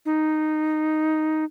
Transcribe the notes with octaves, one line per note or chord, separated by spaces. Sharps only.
D#4